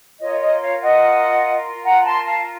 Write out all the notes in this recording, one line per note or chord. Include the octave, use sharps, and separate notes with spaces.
F4 A#4 C#5 D#5
D#5
C#5 F5
D#5 F#5
F#5 A#5
A#5
A5 C6
F5 A5